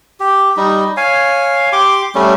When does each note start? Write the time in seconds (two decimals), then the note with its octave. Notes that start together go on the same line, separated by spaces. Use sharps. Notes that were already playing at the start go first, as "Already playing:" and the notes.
0.20 G4
0.57 G3 D#4
0.97 C#5 F5 G#5
1.72 G4 C6 D6
2.15 G3 A3 C#4